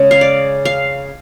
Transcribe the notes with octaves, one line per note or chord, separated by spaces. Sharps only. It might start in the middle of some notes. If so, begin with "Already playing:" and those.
Already playing: C#3 G#3 C#4
F5
D5
F5